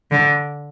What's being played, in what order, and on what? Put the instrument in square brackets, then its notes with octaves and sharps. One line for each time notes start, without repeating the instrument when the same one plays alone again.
[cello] D3